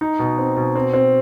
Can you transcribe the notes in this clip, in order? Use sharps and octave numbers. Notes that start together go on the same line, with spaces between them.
D#4
B2
C4
B2
C4
C4